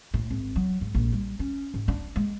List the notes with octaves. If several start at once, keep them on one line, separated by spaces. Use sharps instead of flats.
A2
G#1
F#3
G#2
A#1
G3
C#4
G#2
D4
G#3